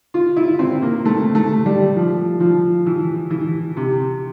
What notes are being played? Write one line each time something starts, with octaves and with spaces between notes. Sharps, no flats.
F4
E4
C4
A#3
A3
A3
G3
F3
F3
E3
E3
C3